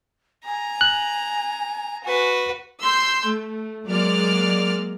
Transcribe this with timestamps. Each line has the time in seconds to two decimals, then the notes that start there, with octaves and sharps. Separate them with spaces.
0.45 G#5 A#5
0.81 F#6
2.04 F#4 B4
2.81 C6 E6 G6
3.24 A3
3.87 F#3 G#3 A#3 D5 F6